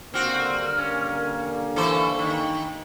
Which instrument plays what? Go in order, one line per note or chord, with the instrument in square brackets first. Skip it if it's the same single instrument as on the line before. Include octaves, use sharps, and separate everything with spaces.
[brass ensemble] D3 G3 A#3 [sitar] C4 F#4 [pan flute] F6
[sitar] C#4
[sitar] E3 A4 C5 [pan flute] C#6
[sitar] D#3